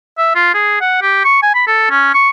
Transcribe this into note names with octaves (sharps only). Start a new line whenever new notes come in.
E5
F4
G#4
F#5
G4
C#6
G#5
B5
A4
C#4
C#6